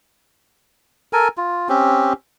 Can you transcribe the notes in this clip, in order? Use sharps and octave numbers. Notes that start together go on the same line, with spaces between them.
A4 A#4 G#5
F4
C4 C#4 G4